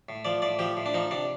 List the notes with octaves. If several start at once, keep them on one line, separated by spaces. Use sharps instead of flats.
A2
F3 D5
A2 D5
F3 G4
A2
D4
F3 D#4
C3 D4